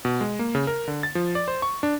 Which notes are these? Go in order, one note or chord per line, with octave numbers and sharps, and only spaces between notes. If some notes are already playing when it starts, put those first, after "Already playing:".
B2
G#3
A#3
C#3
A#4
D3
A6
F3
D5
C5
C#6
D4